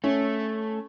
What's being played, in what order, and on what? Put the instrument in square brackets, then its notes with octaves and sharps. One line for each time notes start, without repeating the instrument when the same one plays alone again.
[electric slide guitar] A3 [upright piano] C#4